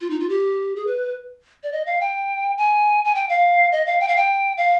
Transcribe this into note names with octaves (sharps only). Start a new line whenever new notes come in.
F4
D#4
F4
G4
G#4
B4
D5
D#5
F5
G5
G#5
G#5
G5
F5
D#5
F5
G5
F5
G5
F5